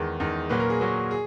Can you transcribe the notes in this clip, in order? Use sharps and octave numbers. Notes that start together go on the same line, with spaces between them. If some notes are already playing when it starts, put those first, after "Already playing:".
Already playing: E2 D#3 G#3
E2 D#3 G#3 D#4
A#2 F#3 B4
A#4
G#4
A#2 F#3 F#4
G#4